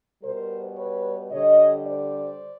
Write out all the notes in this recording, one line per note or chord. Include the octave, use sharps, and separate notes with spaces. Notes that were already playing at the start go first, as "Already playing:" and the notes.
B2 G3 A#4 C5
B4 C#5
D3 G3 C#5 D#5
C5 D5